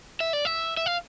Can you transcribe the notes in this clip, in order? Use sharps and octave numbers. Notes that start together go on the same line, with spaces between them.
E5
D5
E5
E5
F5